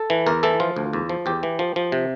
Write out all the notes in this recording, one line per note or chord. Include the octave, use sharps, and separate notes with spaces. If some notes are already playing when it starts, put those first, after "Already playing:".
Already playing: A4
E3
E2 A#4
E3 A4
F3 F4
D2
E2
F3
E2 G4
E3
F3
F3
C3